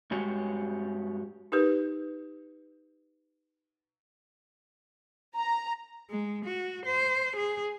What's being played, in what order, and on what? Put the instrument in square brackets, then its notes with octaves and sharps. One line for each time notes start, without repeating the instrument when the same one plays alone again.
[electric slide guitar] G2 G#3 F#4 G4 C#5
[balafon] D#4 G4 A#4 B4
[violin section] A#5
[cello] G#3
F#4
C5
G#4